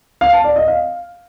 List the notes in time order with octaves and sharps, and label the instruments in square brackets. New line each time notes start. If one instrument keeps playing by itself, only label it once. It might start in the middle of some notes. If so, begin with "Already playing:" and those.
[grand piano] F5
A5
D5
D#5
F5